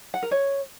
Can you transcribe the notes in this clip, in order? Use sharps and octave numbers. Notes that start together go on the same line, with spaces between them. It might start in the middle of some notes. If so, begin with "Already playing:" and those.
F#5
A#4
C#5